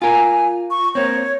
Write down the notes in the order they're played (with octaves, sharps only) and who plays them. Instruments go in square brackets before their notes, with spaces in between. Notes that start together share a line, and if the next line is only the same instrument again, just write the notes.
[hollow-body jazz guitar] F4 A#4 [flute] G#5
[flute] C#6
[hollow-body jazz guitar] A#3 C4 [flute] C#5